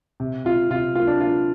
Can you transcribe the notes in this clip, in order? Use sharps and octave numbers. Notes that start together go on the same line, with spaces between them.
C3
C3 F4
C3 F4
A#3 F4
D4
A#3 F4